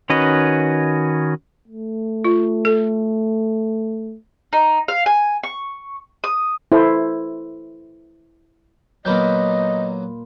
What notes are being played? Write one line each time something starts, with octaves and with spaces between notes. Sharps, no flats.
D#3 C#4 F#4 B4 D#5
A3
F4
A4
D#4
F5
G#5
C#6
D#6
E4 A4 C5
A#2 F#3 A#3 B3 D#5 B5 G6